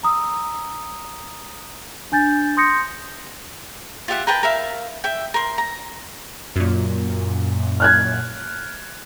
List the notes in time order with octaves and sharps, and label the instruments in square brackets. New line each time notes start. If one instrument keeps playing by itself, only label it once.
[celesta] A#5 D#6 E6
D4 G#5 G6 A6
C6 D#6 G6 A#6 C#7
[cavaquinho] F4 G4 E5 F#5
A#4 B4 G5 A5
A#4 E5 F5
E5 G5
A#4 C6
A#5
[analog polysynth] F#2 A#2
[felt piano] F6 F#6 G#6